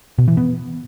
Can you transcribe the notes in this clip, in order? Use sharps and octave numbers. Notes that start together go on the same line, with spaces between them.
B2
E3
B3